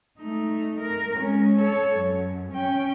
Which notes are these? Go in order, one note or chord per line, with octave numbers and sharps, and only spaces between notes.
A3 D#4
A#4
G#3 C#4
A4 C#5
F#2
C#4 G5